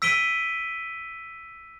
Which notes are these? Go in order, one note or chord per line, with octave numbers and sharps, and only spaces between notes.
E6 B6 D7 D#7 G7